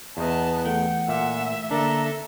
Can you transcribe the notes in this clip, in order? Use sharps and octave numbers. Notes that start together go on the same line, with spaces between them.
E2 B3 D#5 A5
E3 A3 F#5 G5
A#2 E5
D3 A#3 D4 A4 E5 A#5